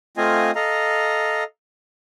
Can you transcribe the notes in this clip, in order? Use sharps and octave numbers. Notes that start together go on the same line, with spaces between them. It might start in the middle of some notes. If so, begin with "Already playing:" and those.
A3 C4 F4 D#5 F5 G#5
A4 D#5 F5 A#5